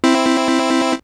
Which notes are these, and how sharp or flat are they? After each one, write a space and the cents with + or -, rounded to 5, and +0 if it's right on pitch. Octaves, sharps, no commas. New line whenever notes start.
C4 +0 E4 +0